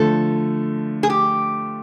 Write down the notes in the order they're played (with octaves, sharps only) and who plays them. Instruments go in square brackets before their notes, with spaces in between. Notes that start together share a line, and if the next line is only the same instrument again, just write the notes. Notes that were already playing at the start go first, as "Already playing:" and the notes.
Already playing: [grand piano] D3 F3 A3 [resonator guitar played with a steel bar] A4
[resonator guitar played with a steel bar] G#4
G4